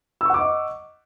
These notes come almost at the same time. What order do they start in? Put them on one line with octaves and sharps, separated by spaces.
E6 C#6 F#5 D6 D#5